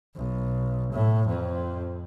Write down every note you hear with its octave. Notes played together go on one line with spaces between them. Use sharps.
B1
A2
F2